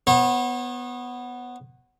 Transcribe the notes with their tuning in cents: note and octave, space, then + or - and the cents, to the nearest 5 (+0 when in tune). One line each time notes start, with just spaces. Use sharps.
B3 +0 C#5 -40